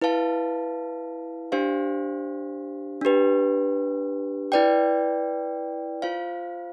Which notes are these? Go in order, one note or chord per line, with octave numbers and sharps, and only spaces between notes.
E4 B4 F5 A5
D4 G4 C5 F5
D4 G4 B4
E4 B4 D5 G5
F4 C5 F5